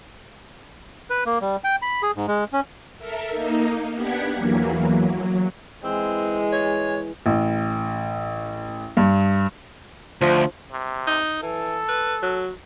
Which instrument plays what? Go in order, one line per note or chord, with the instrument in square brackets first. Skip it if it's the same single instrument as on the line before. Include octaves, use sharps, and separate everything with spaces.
[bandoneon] B4
A#3
G3
G5
B5
G#4
G#2
G#3
C#4
[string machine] A4 A#4 E5
A#3 D#4
B3 D4 G4 F#5 G#6 B6
E2 E3 F#3 A#3
F#3
[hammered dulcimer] E3 [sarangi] G#3 [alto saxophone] C4
[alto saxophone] C#5
[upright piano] A1
G2
[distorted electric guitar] D2 [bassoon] F3
[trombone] C3
[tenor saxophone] D#4
[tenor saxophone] E3 [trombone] A4
[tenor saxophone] B4
F#3